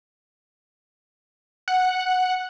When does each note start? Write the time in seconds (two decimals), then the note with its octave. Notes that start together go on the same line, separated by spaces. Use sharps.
1.68 F#5